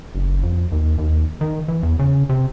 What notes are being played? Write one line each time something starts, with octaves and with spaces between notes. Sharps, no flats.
F#1
F2
D#2
D#2
D#3
E3
E2
C#3
C3